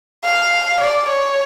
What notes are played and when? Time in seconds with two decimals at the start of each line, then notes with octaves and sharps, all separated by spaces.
0.24 F5
0.81 D5
1.09 C#5